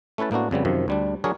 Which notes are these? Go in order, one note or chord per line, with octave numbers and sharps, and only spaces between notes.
A3 C#4 E4 B4 A5
A2 A#3 B3 D4 F#4
F2 C#3 G3 B3
F#2 C3 D#3 F3
D2 G3 D4
F#3 D4 G#4 A#4 C#5